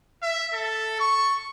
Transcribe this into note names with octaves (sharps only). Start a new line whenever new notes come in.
E5
A4
C#6